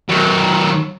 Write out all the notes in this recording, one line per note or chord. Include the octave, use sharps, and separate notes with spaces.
D#3 F#3